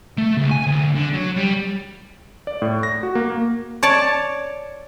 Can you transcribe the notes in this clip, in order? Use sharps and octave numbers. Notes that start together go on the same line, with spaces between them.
A3
C#2
G#5
D2
D3
F#3
G3
D5
A2
A#6
F#4
A#3
C#5 D5 A5